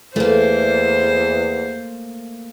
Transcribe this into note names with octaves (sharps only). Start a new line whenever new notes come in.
E2 E3 A3 A#3 C5